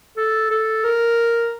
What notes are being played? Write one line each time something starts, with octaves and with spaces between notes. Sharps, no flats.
A4
A4
A#4